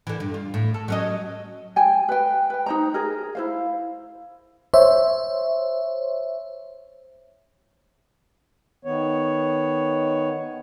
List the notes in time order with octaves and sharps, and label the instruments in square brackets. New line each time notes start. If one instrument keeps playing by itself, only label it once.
[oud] D3 E3
G2
F4
A2
A4
F#3 C#4 D#5
[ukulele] G5 G#5
B4 G5
B4 G5
D#4 C5 A#5
G#4 A#4
E4 C5 F5
[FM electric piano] C5 C#5 E5
[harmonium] D#3 B3 C#5